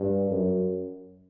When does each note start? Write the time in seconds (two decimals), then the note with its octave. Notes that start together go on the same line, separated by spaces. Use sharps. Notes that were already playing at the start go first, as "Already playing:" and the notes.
Already playing: G2
0.30 F#2